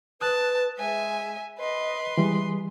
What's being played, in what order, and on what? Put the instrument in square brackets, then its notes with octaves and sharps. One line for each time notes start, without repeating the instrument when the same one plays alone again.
[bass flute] B4 [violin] A5 [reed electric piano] D#6 F#6
[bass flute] G#3 [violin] E5 G#5
[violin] B4 C6 [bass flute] D#5
[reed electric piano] E3 G3 [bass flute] G#3